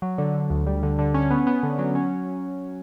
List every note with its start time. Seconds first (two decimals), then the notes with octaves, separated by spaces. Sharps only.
0.02 F#3
0.18 D3
0.35 D3
0.50 D2
0.66 G3
0.83 D3
0.99 D3
1.14 C#4
1.31 B3
1.47 B3
1.63 D3
1.79 F#3
1.95 C#4